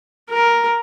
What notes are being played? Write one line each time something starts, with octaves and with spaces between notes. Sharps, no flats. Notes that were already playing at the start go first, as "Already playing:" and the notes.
A#4